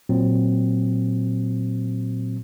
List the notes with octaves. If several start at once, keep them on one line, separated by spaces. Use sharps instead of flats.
A#2 F#3 C4